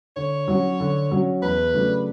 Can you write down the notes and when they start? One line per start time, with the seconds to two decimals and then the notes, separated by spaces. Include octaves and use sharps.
0.16 D3 C#5
0.48 F#3 C#4 F#4
0.80 D3
1.11 F#3 C#4 F#4
1.42 E2 B4
1.74 C#3 F#3 A3 D4